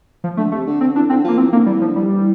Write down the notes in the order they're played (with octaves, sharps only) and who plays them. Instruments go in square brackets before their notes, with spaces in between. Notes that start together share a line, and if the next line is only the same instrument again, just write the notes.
[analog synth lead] F3
[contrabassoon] D3 [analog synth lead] A3
[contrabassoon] C3 [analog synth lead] A3
[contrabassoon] D3
[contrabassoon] D3 [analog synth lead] C4
[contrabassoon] E3 [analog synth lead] D4
[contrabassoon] D3 [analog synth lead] C4
[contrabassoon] F3 [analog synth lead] A#3
[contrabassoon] E3 [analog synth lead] C4
[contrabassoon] D3 [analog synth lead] A#3
[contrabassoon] E3 [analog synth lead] G3
[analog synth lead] F3
[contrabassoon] D3
[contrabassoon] E3 [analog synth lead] G3
[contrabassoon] E3